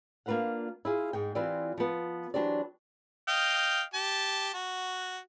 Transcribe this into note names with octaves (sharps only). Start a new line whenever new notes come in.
A#3 D4 F4 B4 F5 F#5
E4 F4 G#4
G#2 G#3 G5
E3 C4 E4 F4 G4 D5
F3 B3
E3 F#3 D4 G4 C5 D5
D#5 F5 G5
G4 A5
F#4